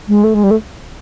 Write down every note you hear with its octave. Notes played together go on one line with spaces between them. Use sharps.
G#3
A3
G#3
G3
A3